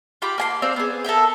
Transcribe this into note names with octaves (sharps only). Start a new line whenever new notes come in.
F4 G4 B5 D6
A#3 G#5 C6
C4 C5 D5 F5
B3 G#4
A4 A#4 E5 G5